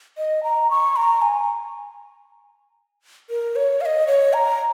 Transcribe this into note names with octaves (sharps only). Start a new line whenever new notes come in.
D#5
A#5
C#6
A#5
G#5
A#4
C#5
F5
D#5
C#5
A#5